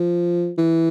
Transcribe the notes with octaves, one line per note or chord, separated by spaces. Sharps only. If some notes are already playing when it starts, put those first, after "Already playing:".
Already playing: F3
E3